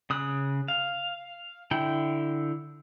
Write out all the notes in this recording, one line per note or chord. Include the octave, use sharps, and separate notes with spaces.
C#3 D#6 F#6
F5
D3 E4 G5